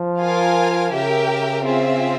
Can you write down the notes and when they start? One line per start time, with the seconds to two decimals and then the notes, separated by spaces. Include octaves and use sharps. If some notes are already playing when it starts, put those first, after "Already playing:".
Already playing: F3
0.19 F4 A#4 F5 G#5
0.92 C#3 G4 A#4 E5 G5
1.66 C4 F4 G#4 E5